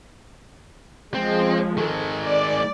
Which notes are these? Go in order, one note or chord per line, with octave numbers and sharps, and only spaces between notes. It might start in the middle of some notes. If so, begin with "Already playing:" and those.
F3 G#3 C4
D#3 G#3 A4
D5